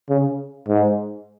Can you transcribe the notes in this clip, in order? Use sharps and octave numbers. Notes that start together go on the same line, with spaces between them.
C#3
G#2